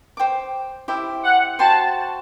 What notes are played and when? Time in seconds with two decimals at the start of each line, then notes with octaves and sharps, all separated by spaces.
0.17 C5 G5 D6
0.88 E4 G4 C5 E5
1.23 F#5
1.59 F#4 C5 G5 A5 C6